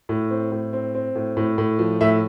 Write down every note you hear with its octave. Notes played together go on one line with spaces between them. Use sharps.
A2
C4
A2
C4
C4
A2
A2
A2
F3
A2 E5